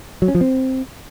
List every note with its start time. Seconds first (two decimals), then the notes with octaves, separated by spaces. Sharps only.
0.22 F#3
0.28 C#4
0.35 F3
0.41 C4